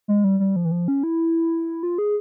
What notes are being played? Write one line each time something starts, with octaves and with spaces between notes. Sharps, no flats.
G#3
G3
G3
F3
E3
F3
C#4
E4
F4
G#4